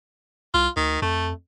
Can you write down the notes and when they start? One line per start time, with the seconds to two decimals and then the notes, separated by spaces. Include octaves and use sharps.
0.54 C2 F4
0.77 D2 D#3
1.02 F2 A3